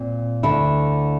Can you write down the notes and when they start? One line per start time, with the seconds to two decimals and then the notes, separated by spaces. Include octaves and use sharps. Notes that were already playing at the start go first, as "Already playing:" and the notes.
Already playing: A#2 C4
0.43 D2 D3 A3 E4